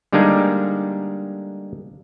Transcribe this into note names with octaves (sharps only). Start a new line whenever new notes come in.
D3 G3 G#3 A#3 D4 D#4